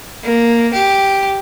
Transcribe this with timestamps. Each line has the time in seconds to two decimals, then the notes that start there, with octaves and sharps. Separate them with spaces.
0.24 A#3
0.73 G4